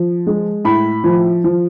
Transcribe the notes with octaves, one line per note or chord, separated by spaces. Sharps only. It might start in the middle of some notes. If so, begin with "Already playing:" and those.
Already playing: F3
G#3
A2 B5
F3
F3